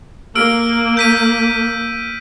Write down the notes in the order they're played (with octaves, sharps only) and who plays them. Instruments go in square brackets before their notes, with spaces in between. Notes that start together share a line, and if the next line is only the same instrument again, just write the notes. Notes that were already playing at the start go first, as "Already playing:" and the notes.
[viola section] A#3 [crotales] E6 F6 D7
[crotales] G6 B6 D#7